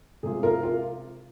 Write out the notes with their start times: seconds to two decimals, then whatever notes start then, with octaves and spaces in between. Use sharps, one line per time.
0.23 C3 G#3 F4 G#4
0.43 F4 A#4
0.63 F4